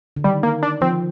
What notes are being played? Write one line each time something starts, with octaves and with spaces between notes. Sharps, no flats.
D3
D#3 G3
A#3
D4
F3 C4